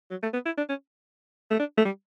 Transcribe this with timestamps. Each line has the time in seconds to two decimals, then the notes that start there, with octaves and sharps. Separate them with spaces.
0.11 F#3
0.23 A3
0.33 B3
0.46 E4
0.57 D4
0.69 C#4
1.51 A3
1.59 D4
1.77 A3
1.85 G3